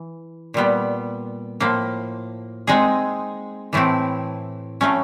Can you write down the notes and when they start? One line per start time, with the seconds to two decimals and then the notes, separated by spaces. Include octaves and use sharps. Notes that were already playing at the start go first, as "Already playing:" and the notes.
Already playing: E3
0.54 A#2 G3 B3
1.60 A2 F3 A#3
2.67 G#3 C4 D#4 G#4
3.73 A2 E3 A3 C4 E4
4.81 A2 F#3 A3 C#4